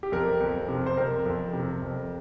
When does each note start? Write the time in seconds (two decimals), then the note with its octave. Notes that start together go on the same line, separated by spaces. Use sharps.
0.03 G4
0.12 F2 A#4
0.41 F2
0.69 C3
0.86 C5
0.97 F2 A#4
1.26 F2
1.53 C3
1.82 F2